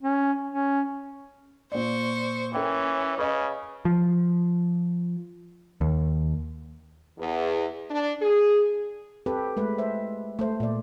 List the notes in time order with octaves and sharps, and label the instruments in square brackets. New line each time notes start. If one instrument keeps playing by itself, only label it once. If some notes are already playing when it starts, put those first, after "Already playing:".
[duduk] C#4
C#4
[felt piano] A#2 D5 [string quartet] C5 C#6
[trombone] E3 [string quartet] C#4 [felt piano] A#4 G5
[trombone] C#3 [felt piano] B4 D#5
[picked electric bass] F3
D#2
[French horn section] E2
D4
G#4
[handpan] C4 G4 A4 B4
G#3 A3 B4
C5 E5
A3 C5
A#2 D5